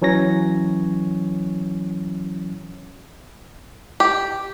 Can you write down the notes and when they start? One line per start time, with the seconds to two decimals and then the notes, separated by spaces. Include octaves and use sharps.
0.02 E3 F#3 C#4 C#5 A#6
4.00 G4